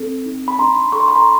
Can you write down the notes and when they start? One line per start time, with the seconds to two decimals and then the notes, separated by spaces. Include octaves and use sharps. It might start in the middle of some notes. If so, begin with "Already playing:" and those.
Already playing: C4 A4
0.26 D#4
0.48 B5
0.59 D4 A#5 C6
0.92 A4 C#6
1.00 C6
1.08 B5
1.16 A#5 C6